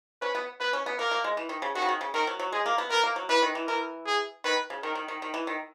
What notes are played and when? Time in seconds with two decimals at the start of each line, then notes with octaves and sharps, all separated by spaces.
0.21 C#4 B4
0.35 B3
0.60 B3 B4
0.73 C#4
0.86 B3
0.99 A#3 A#4
1.11 A#3
1.24 G#3
1.37 E3
1.49 D#3
1.62 C#3
1.75 D#3 F#4
1.82 C#3
1.89 D#3
2.01 C#3
2.14 D#3 A#4
2.27 F#3
2.40 F#3
2.52 G#3 G#4
2.66 A#3
2.78 B3
2.90 B3 A#4
3.03 A#3
3.16 F#3
3.29 E3 B4
3.42 D#3
3.55 E3
3.68 E3 A#4
4.06 G#4
4.44 D#3 B4
4.70 C#3
4.83 D#3 A#4
4.95 D#3
5.08 D#3
5.22 D#3
5.34 E3
5.47 D#3